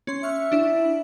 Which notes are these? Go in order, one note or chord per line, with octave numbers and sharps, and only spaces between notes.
C#4 C6
E5 C#6 F6 F#6
D4 E4